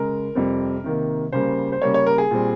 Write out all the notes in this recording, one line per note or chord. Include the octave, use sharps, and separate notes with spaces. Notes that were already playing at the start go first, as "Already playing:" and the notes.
Already playing: C#3 G#3 A#4
F2 C3 G3 C4
C3 D#3 A#3
C#3 G3 A#3 C5
C5
C#3 G3 A#3 C#5
C#5
A#4
G#4
A#2 G3 C4